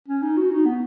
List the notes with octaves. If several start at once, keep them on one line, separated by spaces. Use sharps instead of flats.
C#4
D#4
F#4
D#4
B3